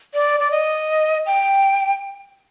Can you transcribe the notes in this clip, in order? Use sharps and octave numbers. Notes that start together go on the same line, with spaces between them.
D5
D5
D#5
G5